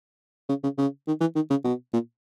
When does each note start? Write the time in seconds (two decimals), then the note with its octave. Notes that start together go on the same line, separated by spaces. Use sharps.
0.49 C#3
0.63 C#3
0.78 C#3
1.07 D#3
1.20 E3
1.35 D#3
1.50 C#3
1.64 B2
1.93 A#2